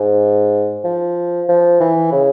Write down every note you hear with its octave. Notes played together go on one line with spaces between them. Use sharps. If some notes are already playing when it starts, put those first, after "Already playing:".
Already playing: G#2
F3
F3
E3
C#3